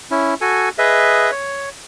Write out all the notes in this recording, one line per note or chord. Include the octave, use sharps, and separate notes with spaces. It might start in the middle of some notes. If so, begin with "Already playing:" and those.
C#4 E4
F#4 A4 G#5
G#4 B4 D#5 E5
C#5